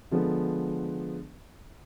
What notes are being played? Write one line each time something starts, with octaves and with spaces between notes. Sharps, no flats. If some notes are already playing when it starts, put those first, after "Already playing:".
D3 F3 G#3 B3